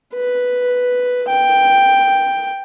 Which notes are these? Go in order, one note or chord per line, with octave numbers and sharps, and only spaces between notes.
B4
G5